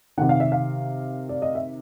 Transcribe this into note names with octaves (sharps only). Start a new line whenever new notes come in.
C3 D#3 F#5
F5
E5
F5
D5
D#5
E5